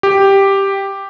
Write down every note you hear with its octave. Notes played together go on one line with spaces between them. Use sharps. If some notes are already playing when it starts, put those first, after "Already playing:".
G4